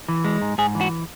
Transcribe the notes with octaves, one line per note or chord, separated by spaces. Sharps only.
E3
G#3
G#2
G#2 G#4
E3
F#4